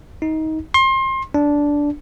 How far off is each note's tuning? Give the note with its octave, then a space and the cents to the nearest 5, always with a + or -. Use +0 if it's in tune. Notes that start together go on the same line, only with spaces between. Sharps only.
D#4 +20
C6 +30
D4 -10